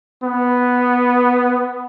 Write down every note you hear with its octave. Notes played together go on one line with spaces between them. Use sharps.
B3